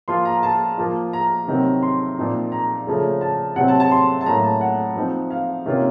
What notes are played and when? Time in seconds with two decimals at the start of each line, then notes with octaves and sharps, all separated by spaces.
0.08 F3 A#3 F4 C6
0.25 A#5
0.43 A5
0.78 F3 A#3 F4
1.13 A#5
1.48 C3 D#3 F#3 C4
1.82 C6
2.18 A#2 F3 C4 D#4
2.52 A#5
2.87 C#3 F3 A3 C#4
3.21 A5
3.56 C3 F#3 C4 F#5
3.68 A5
3.80 A5
3.91 C6
4.21 A5
4.26 A2 F#3 A#3 A#5
4.43 A5
4.61 F#5
4.96 F3 C4 D#4
5.30 F5
5.66 C3 D#3 A#3 C#4 F4